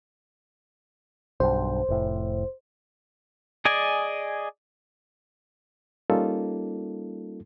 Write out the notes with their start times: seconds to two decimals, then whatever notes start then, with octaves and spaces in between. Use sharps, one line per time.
1.40 B1 G2 C5
1.89 F1 A2
3.65 G#4 D5 D#5 G#5
6.10 G3 A#3 C#4 D#4 F4 A4